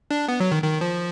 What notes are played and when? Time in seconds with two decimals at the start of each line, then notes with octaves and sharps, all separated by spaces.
0.10 D4
0.28 B3
0.40 F#3
0.52 D#3
0.63 D#3
0.81 F3